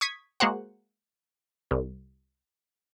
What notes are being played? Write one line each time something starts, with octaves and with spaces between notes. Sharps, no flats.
C#6 D#6 G#6 B6
G#3 A#3 F#4 C5 F#5
C2